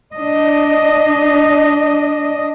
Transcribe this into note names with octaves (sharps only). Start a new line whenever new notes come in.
D4 D#5